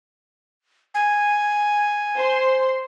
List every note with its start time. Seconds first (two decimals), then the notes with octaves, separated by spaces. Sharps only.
0.94 G#5
2.17 C5 C6